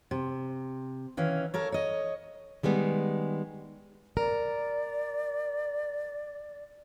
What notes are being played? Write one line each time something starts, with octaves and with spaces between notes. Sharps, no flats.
C3
D#3 E3 C#4 F5
A4 A#4 C#5
C#5 D#5
D#3 G3 G#3 B3
A#4 D5